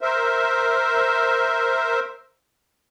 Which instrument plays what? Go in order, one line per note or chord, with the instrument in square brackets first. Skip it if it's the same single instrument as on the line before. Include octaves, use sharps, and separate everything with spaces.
[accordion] A#4 C5 E5